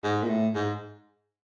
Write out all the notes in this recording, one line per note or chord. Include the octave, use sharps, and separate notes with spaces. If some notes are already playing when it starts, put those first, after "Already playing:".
G#2
A#2
A2
G#2